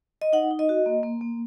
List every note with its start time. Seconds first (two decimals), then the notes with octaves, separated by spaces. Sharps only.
0.21 D#5
0.33 D#4 F#5
0.51 D#4
0.59 D#5
0.69 F#4
0.86 A#3
1.03 A#3
1.21 A#3